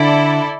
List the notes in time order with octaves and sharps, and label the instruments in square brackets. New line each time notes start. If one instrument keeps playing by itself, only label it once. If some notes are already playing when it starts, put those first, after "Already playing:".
Already playing: [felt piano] D3 [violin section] E4 A4 D5